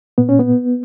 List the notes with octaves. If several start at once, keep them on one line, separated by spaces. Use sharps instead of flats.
A#2 B3
C#4
B3